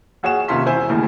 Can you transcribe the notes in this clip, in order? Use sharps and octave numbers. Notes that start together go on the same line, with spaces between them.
A#1 F#4 G#4 C#5 F#5 E7
D#2 C3 C#4 F4 C6 B6
E1 E4 C5 G#5
D#2 A2 C#3